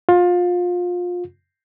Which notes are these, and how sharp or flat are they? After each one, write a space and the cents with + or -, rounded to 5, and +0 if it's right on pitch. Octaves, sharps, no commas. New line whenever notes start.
F4 +25